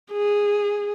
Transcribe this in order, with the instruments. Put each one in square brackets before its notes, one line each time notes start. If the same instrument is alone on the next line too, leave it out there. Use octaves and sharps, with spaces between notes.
[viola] G#4